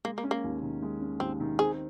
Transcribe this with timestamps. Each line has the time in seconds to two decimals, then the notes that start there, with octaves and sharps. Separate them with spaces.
0.05 G#3 A#3
0.18 A#3
0.24 C#4
0.31 A#3
0.44 D#2
0.63 D#3
0.82 G#3
1.01 C#4
1.20 D#2 C4
1.40 D#3
1.59 C4 G#4